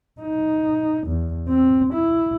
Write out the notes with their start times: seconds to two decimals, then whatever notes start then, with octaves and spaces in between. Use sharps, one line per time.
0.21 D#4
1.07 E2
1.48 C4
1.94 E4